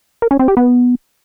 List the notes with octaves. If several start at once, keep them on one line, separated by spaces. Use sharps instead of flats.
A#4
C#4
C4
G4
B3